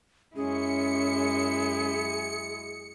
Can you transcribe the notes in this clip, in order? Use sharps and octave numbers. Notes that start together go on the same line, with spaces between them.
F#2 G#3 C#4 E4 G#4 C#7